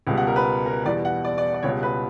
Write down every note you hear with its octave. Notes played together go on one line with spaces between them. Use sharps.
C#2 B2 G3
F#5
A#4
B4
A#4
E2 B2 G3 D5
F#5
D5
D5
D5
C#2 B2 G3 C#5
B4